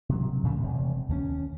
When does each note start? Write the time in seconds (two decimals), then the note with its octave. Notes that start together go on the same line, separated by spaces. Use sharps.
0.09 C3 F#3
0.43 A#2 C#3 F3 A3
0.60 E1 C3
1.09 D#2 G3 C#4